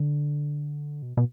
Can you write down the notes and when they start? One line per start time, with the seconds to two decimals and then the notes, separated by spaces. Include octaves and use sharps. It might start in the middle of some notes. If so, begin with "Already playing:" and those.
Already playing: D3
1.02 B2
1.17 B2